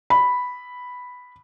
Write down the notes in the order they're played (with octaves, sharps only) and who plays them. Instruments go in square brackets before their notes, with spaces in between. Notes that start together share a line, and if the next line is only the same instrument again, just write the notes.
[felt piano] B5